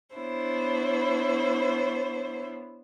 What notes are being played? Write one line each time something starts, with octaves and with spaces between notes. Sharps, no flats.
B3 D4 E4 C5 C#5